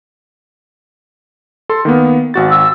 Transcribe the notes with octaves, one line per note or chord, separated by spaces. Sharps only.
A4 C6
D#3 A#3 B3
G#1 F#4 A6
E6